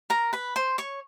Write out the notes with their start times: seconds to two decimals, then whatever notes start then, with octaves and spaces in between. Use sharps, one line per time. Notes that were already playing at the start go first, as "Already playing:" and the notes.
0.10 A#4 A#5
0.33 B4 B5
0.56 C5 C6
0.78 C#5 C#6